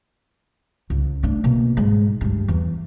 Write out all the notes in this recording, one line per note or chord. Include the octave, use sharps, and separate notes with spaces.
C#2
A3 D4
B2 A#3
G#2 G#3
D2 G2
E2